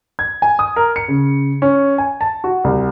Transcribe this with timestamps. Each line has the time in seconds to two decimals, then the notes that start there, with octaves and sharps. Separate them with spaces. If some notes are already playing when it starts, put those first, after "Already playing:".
0.19 G#6
0.42 G#5
0.59 D#6
0.76 A#4
0.96 C#7
1.08 C#3
1.62 C#4
1.98 G#5
2.21 A5
2.44 F#4
2.64 C2